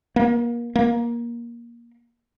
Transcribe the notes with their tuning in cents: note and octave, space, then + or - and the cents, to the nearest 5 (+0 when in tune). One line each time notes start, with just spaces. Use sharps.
A#3 +30
A#3 +15